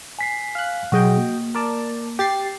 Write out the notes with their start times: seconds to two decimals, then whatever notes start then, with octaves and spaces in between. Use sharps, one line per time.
0.19 G#5 B6 C7
0.55 F5 F#6
0.92 B2 F#3 F#4 G#4 D#5 G5
1.17 A#3
1.55 A#4 D5 A5
2.19 G4 A6 C7